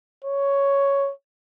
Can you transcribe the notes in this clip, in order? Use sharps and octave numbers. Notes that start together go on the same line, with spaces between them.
C#5